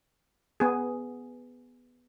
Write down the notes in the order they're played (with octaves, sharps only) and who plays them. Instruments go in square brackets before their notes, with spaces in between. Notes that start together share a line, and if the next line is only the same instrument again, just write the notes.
[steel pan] B3 G#4